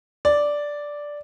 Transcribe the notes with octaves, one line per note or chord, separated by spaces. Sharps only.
D5